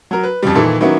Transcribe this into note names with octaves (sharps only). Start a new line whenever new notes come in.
F#3 A#4
B4
F2 C#3 G3
A#2 D#3 E3 A4
D#3 F#3 A#3 B3 C#4 E4